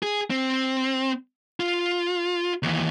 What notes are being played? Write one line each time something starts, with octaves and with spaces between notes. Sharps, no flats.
G#4
C4
F4
D#2 E3